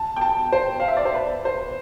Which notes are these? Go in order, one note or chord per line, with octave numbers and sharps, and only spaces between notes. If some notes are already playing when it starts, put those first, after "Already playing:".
Already playing: A5
G5
A5
C5
F5
E5
D5
C5
B4
C5